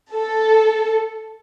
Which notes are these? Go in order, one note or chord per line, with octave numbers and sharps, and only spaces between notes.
A4